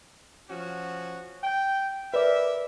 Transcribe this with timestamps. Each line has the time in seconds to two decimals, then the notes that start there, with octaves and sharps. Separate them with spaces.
0.49 F3 C#4 F#4
1.43 G5
2.14 A#4 B4 D5 E5